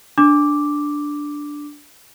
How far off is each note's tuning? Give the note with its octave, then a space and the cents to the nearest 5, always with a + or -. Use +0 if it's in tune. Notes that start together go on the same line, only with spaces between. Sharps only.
D4 +0 D6 +0